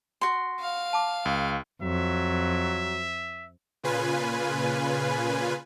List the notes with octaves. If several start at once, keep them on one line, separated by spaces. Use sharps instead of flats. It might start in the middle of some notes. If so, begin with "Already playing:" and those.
F#4 C6
F5
A5 D6
C#2
F2 F#3 E5
A#2 C#3 F4 B4 G#5